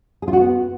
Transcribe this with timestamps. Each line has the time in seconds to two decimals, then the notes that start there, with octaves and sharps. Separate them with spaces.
0.22 G#4
0.28 F4
0.33 F#4
0.38 B3